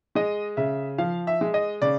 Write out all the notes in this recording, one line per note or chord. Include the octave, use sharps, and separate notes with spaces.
G#3 D#5
C#3 E5
F3 F5
E5
G#3
D#5
C#3 D5